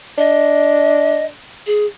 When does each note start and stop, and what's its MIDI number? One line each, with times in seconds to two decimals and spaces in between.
0.18 1.29 62
0.18 1.25 75
1.67 1.86 68